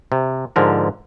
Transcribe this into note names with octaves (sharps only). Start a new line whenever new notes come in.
C3
G#2 D3 F3 A#4